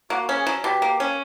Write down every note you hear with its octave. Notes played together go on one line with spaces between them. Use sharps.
A#3 F#4
C#4
G#4
F#3
B2 G4
A#3
C#4